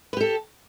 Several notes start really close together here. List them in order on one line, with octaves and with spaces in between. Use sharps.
B4 G4 A4